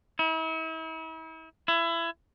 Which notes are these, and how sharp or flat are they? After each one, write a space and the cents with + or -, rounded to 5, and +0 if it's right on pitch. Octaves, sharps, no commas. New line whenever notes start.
E4 -40
E4 +25